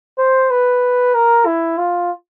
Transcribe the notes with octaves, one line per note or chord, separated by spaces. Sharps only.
C5
B4
A#4
E4
F4